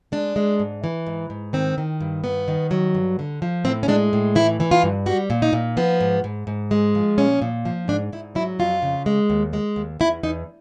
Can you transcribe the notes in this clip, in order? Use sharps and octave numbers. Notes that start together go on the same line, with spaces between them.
G#3 D4
G#3
G#2
E3
G#2
G#2
D#3 C4
D#3
G2
D#3 B3
D#3
F#3
G2
D3
F3
A2 C4
C#4
G#3 D4
A2
E3 E4
E3
F4
G2
G3 F#4
A#2
D#4
A#2
F3 B3
G#2
G#2
G#2
G#3
F3
A#2 C#4
A#2
F3
G#2 D4
G#2 E4
F#3 E4
F2 F4
C#3
G#3
D#2
G#3
D#2
E2 E4
E2 D#4